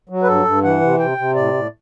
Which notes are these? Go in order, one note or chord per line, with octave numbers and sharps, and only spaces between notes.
F#3
B4
G2 A4
G2
E3 F#5
C3
C3 G5
C3
A2 D5
A2